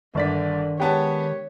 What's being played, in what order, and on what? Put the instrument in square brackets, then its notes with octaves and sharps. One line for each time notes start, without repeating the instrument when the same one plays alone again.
[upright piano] G1 D5 B6 [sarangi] D3 [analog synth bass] D#3
[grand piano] G#3 B3 A5 [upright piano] G4 [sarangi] C#5